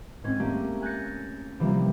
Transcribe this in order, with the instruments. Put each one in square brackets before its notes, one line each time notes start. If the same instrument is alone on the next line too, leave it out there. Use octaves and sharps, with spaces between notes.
[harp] G#2 C4 C#4 G#6
A3 A#3 C#4 G4
G#5 F#6 G6 A6 A#6 C#7
C3 E3 F3 G3 A#3